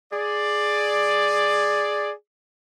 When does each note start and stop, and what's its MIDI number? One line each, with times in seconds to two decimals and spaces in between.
0.13 2.12 68
0.13 2.12 74